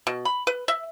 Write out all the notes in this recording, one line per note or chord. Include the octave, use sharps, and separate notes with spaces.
B2
B5
B4
E5